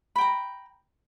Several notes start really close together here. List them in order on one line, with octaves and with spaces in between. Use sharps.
B5 G5 A#5